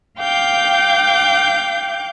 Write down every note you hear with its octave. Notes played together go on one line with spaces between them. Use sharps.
F5 G5 D6 G6